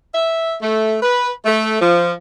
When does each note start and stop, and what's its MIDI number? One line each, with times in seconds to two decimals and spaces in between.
0.13 0.56 76
0.61 0.97 57
1.02 1.31 71
1.45 1.81 57
1.81 2.12 53